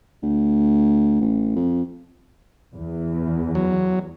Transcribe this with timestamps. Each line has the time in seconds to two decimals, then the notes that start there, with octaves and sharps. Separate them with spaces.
0.22 D2
1.21 A1
1.56 F2
2.76 E2
3.55 F#3